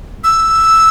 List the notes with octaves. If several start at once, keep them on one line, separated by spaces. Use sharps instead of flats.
E6